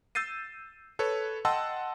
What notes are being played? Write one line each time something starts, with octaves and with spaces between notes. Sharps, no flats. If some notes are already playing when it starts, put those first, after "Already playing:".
E6 G6 A6 C7 D#7
A4 B4 C#5
D#5 F#5 G5 A5 C6 E6